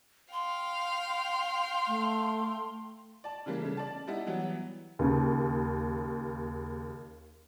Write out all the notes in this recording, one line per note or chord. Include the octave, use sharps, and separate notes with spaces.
F5 G5 C6
A3
D5 A5
C#3 E3 G3 A#3
C#3 A3
D5 A5
G3 B3 D#4 E4
E3 F#3 G3 B3
D#2 C#3